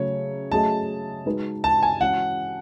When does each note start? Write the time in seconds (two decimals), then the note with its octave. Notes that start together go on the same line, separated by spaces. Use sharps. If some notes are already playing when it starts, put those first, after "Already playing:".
Already playing: C#3 F#3 A3 C#5
0.52 F#3 A3 C#4 G#4 D#5 A5
1.26 G#3 D#4 F#4 B4
1.64 A5
1.83 G#5
2.00 E3 G#3 C#4 F#4 F#5